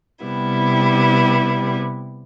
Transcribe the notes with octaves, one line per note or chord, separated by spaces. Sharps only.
C3 G3 B3 E4